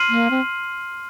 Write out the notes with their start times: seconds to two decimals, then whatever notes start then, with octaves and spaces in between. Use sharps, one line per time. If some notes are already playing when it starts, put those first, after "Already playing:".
Already playing: C6 F6 C7 D#7 F#7
0.09 A#3
0.31 C4